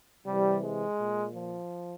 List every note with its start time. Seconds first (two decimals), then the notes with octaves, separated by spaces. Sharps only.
0.27 C3 E3 G3
0.63 G#3
0.99 A#2
1.35 F3